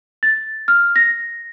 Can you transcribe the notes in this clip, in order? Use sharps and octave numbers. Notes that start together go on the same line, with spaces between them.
A6
F6
A#6